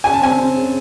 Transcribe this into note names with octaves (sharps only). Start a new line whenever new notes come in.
C#3 G#5
A5
C4 G#5
C4
C#3